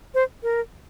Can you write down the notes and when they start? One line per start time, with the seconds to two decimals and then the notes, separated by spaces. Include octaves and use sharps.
0.14 C5
0.43 A#4